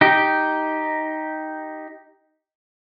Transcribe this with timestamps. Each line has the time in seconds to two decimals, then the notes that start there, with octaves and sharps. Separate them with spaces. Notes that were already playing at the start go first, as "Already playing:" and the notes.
0.01 D#4 G4